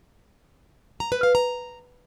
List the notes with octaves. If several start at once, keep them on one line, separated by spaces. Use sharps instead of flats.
A#5
B4
F5
A#5